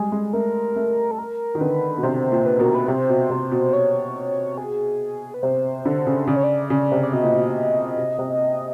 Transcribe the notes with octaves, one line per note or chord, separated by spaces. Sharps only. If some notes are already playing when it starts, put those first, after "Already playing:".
Already playing: G3 G#3 G#4
G#3
A3 A#4
A3
A4
A#4
D#3
D3 B4
B2
C3 C5
A#2
B4
B2 A#4
B4
C3 C5
B2
C3
B2
C#5
G#4
B4
C3 C5
D3
C#3
C#3 D5
C#5
D5
C#3
C3
D5
B2 D#5
A#2
B2
C3
C3